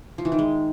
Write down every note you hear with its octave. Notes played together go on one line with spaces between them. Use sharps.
F3
E3
D#3
G#3